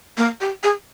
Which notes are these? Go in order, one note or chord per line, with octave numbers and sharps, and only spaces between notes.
A#3
G4
G#4